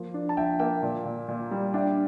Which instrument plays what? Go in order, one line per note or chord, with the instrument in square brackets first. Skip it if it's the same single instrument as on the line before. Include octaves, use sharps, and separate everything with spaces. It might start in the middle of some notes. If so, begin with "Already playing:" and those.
Already playing: [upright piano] F3 A#3
D4
[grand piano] A5
[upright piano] F3 [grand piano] E5 G5
[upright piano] A#3 [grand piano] E5 G5
[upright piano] A#2
A#2
A#2
G3
[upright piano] D4 [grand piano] E5 G5